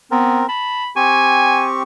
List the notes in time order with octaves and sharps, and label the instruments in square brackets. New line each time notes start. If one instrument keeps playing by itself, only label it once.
[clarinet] B3 [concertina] C4 A#4
[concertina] A5 [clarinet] B5
[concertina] C4 G4 C#6 [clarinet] G#5